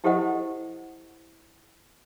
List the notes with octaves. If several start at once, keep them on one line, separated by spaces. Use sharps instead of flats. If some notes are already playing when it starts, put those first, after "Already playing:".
E4 G4 A4 C5 D#5 F#5